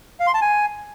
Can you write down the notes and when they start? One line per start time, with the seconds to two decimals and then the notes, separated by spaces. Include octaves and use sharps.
0.20 F5
0.27 C6
0.34 A5
0.42 G#5